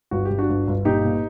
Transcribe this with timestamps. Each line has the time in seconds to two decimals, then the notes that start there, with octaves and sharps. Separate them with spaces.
0.11 G1 F#4
0.25 G1 G4
0.38 D4 F#4
0.48 G1
0.67 G1
0.85 A#2 D#4 G4
1.04 A#2